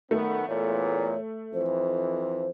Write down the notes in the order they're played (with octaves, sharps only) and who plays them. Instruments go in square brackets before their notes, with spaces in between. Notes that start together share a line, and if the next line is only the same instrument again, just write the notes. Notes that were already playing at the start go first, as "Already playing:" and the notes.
[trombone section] F#2 D#3 B3 [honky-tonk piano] A3
[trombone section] E2 A#2 [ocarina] C#5
[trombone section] F2 E3 [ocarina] C5